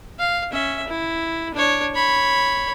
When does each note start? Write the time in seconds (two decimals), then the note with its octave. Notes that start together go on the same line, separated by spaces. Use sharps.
0.19 F5
0.52 C#4 E5
0.88 E4
1.54 D4 C#5
1.95 C#5 B5